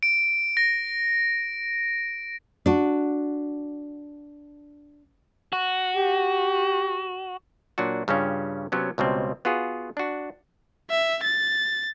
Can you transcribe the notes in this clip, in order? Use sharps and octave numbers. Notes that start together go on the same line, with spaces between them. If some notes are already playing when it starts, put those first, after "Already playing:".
D7
A#6
D4 F#4
F#4
G4
A#2 F#3 D4 F#4
G2 C#3 G3 C#4 F4
C3 F#3 B3 C#4
C#2 B2 G3 C4
B3 F4 F#4 G#4
D4 F#4
E5
A6